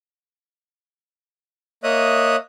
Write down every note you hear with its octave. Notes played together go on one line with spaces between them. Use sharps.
A#3 C#5 D#5 E5 D#6 F#6